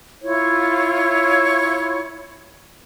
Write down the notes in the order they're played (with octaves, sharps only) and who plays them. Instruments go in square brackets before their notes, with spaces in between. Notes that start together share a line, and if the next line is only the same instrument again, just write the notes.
[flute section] E4 F4 C#5